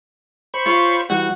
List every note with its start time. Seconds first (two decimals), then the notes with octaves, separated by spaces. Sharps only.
0.54 C5 B5 C#6
0.66 F4 C#5
1.10 E3 G3 F#4 F#5